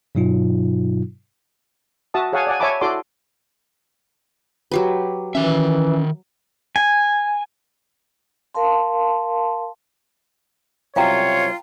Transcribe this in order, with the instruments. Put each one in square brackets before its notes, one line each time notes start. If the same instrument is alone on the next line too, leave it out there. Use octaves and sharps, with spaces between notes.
[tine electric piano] G2 B2 F#3 D#4 F4
[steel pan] F#4 E5 A5 D#6
G#4 C#5 F5 F#5 G#5 A5
D5 F#5 G#5
C#5 E5 G#5 A5 B5 D6
E4 F#4 A4 D5 C6 D6
[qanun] F#3 G4 B4
[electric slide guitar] D#3 E5 [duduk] E3 [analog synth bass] C#4
[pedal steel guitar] G#5
[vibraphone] A#4 F5 A5 C6
[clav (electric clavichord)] C2 F#2 [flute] F4 [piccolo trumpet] C#5 [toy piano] F5 G5 A#5